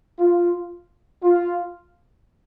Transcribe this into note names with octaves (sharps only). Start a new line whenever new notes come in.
F4
F4